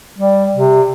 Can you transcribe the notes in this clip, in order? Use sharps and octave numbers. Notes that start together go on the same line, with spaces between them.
G3
C3